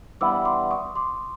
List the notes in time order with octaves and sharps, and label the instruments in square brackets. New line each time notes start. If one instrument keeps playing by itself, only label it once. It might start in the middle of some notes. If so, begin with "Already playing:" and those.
[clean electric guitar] G2 E3 G3 B3 E4 [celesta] D6 E6
[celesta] C6 D6
C#6 D#6
C6 D6